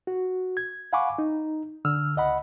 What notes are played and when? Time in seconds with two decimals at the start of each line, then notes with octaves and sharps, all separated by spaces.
0.07 F#4
0.57 G#6
0.93 F5 F#5 G#5 B5 C#6 D6
1.18 D#4
1.85 D3 E6 F6
2.16 C#2 D#5 F#5 B5